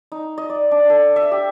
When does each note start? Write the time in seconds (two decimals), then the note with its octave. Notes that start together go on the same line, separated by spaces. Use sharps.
0.12 D#4
0.38 D#5
0.50 D5
0.71 D4
0.90 A4
1.16 E5
1.31 G4